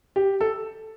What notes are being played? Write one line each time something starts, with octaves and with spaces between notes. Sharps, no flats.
G4
A4